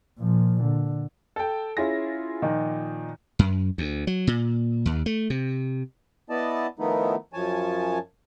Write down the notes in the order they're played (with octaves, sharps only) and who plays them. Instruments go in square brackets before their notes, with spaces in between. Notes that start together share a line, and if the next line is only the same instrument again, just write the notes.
[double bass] A#2 F3
D3
[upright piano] A4 G5
C#4 E4 F4 G#4 A#6
A#2 D#3 F3 D#4
[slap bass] F#2
D2
F#3
A#2
D#2
A3
C3
[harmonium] B3 E4 D5 D#5 A5
D#3 F3 A3 B3 D#4 E4
F#2 F3 C#5 G#5 A5